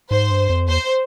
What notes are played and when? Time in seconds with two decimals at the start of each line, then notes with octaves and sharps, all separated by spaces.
0.11 G#2 C5
0.31 G2
0.49 F2
0.68 E2 C5